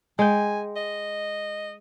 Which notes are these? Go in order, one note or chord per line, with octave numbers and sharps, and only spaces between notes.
G#3 G5 G#5
D#5